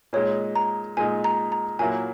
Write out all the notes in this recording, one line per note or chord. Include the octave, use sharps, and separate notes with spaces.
A#2 G#3 D#4 C#5
A#5
A#2 G#3 D#4 G#5
A#5
A#5
A#2 F#3 A#3 E4 G#5